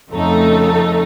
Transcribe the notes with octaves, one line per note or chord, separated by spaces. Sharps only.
F2 C#3 A3 D#4 A4